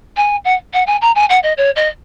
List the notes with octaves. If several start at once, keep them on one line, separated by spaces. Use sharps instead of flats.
G#5
F#5
F#5
G#5
A#5
G#5
F#5
D#5
C#5
D#5